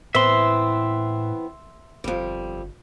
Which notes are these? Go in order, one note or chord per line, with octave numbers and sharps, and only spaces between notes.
A2 E3 B3 C4 E5 C6
G1 F2 G3